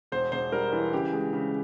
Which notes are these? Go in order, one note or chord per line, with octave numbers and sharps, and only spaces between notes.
E1 C5
E1 C5
G3 A#4
E3
C#3 G4
G#3
C#3